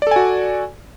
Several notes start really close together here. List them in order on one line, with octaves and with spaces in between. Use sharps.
D5 A4 G#5 F#4